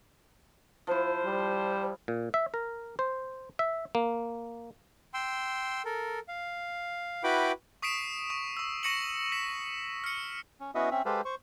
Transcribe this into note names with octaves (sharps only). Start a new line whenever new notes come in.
F3 E4 C5
G3
A#2
E5
A#4
C5
E5
A#3
G5 C6 E6
A4 A#4
F5
E4 F#4 B4 G5 B5 D6
C#6 D#6 B6 C7 D7 E7
C#6
C#6 E6
C#6 A#6 C#7 E7 F#7
B6 E7
F6 C#7
C#4
B3 C#4 E4 F#4 D#5 E5
C4 C#4 E5
G#3 G4 A4 B4 C5 F5
C5 C#6